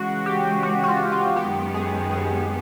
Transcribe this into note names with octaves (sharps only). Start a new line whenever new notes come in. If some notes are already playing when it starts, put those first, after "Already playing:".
Already playing: C#3 E3 G#3 F#4
G4
F#4
F#4
F4
F4
F#2 D#3 G#3 B3 G4
G#4
G#4